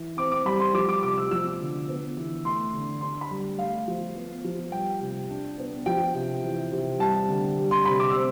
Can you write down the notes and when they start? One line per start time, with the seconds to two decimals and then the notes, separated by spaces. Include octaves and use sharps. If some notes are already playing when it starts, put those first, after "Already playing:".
Already playing: E3
0.17 C4 D6
0.32 D6
0.45 G3 B5
0.60 C6
0.74 F3 D6
0.89 D6
1.02 C3 D6
1.17 E6
1.31 F3 E6
1.60 D3
1.88 B3
2.17 E3
2.44 A3 C6
2.74 D3
3.01 D4 C6
3.21 B5
3.31 G3
3.58 A3 F5
3.88 F3
4.16 B3
4.44 F3
4.72 G3 G5
5.01 C3
5.29 D4
5.58 B3
5.86 F3 G5
6.14 C3
6.43 E3
6.72 C3
6.99 G3 A5
7.29 D3
7.57 G3
7.71 C6
7.85 C3 B5
8.00 D6
8.10 C4 E6